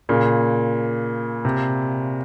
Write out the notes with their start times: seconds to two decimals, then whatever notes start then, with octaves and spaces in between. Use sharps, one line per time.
0.09 A#2 C#3
1.45 C3